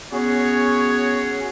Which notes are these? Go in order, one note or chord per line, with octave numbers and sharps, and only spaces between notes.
B3 C#4 F#4 G#4 C#5